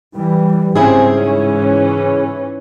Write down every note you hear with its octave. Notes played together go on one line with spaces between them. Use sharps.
E3 G3
G#2 C#3 C4 E4 G#4
E3 C#4